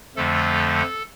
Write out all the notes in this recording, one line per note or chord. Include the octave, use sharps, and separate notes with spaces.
F2 D3 F3 A3 A4